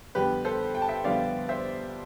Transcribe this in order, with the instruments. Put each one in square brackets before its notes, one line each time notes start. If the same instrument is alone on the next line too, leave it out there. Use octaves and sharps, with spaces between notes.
[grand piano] F2 D3 G3 B3 G4 B4
A4 C5
G5
A5
E5 G5
F2 D3 G3 B3 D5 F5
C5 E5